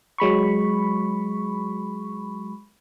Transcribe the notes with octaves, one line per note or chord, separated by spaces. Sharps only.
F#3 G#3 B5 C#6